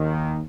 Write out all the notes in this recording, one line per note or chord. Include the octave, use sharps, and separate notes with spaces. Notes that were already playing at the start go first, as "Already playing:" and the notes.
Already playing: D#2 D#3